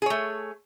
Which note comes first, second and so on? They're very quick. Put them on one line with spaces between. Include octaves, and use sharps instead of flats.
G#4 C#5 A3